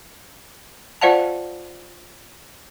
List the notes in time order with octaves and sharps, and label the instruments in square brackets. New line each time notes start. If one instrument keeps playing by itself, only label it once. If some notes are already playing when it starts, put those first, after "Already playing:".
[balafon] F4 C5 D5 F5 F#5 A5